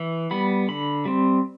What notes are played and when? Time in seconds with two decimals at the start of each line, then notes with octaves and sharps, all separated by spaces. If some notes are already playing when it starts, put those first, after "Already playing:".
Already playing: E3
0.31 G3 B3 B5
0.68 D3 B5
1.05 G3 C4